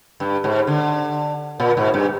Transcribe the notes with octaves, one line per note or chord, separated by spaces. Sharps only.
G2
G#2
D3
A#2
G#2
G2